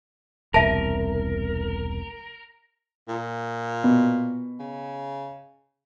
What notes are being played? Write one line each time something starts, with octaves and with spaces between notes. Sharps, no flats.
E1 C2 A#4 E5 A5
A#2
B2
C#3